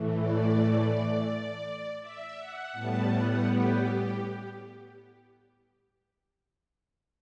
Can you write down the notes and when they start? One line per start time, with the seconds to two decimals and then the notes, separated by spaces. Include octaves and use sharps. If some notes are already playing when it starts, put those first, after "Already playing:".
Already playing: A2 E3 A3
0.19 D5
2.01 E5
2.37 F#5
2.73 A2 G3 B3 A5
3.10 F#5
3.45 G4